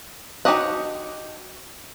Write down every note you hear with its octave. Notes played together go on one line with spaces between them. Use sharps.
D#4 F#4 G4 D#5 F#5